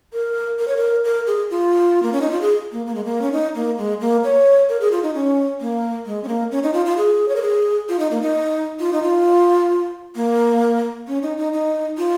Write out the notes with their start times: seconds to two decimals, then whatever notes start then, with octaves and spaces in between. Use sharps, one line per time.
0.13 A#4
0.59 A#4
0.68 C#5
0.77 A#4
1.04 A#4
1.27 G#4
1.51 F4
2.03 A#3
2.13 C#4
2.22 D#4
2.31 F4
2.41 G#4
2.72 A#3
2.87 A#3
2.95 G#3
3.05 A#3
3.22 C#4
3.32 D#4
3.55 A#3
3.78 G#3
4.01 A#3
4.24 C#5
4.69 A#4
4.81 G#4
4.92 F4
5.03 D#4
5.14 C#4
5.61 A#3
6.06 G#3
6.24 C#4
6.28 A#3
6.51 C#4
6.63 D#4
6.74 F4
6.86 F4
6.98 G#4
7.28 C#5
7.36 A#4
7.42 G#4
7.89 F4
7.99 D#4
8.11 A#3
8.22 D#4
8.80 F4
8.93 D#4
9.03 F4
10.16 A#3
11.08 C#4
11.22 D#4
11.38 D#4
11.53 D#4
11.98 F4